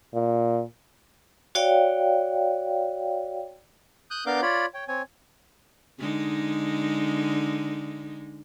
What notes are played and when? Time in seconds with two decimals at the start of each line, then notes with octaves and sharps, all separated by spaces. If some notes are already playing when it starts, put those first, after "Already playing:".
0.14 A#2
1.55 F#4 C#5 D5 F5 G5
4.11 D#6 F#6 G6
4.26 B3 D4 A#4 F5 D6 G6
4.42 F4 C#5 D5 B5
4.74 C#5 G5
4.88 C4 C#5 G#5
5.99 D3 G#3 D#4